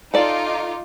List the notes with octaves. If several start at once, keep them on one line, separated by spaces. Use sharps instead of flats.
D#4 F4 A4 D5 D6